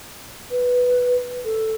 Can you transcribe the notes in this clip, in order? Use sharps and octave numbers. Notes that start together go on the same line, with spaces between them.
B4
A4